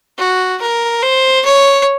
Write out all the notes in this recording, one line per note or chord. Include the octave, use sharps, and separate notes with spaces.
F#4
A#4
C5
C#5